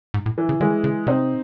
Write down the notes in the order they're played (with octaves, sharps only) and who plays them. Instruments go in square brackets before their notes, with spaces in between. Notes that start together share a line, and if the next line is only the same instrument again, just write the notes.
[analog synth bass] G#2
A2
[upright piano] E3
[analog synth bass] C#3
[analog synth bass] D#3 [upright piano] E3 G#3
[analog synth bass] C#3
[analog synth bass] C3 [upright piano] C4 D#4